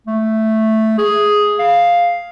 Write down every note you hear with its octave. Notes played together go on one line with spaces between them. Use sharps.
A3
G#4
F5